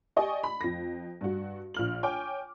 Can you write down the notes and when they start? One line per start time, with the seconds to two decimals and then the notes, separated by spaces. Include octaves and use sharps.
0.16 G4 D5 D#5 G#5 C#6
0.43 B5
0.61 F2 A#6
1.21 G2 F#4
1.74 A#1 F6 F#7
2.03 C#5 G5 G#5 D6